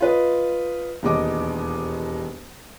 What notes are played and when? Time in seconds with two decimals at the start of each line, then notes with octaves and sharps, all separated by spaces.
0.01 F4 B4 D#5
1.03 E1 D#2 D#5 D6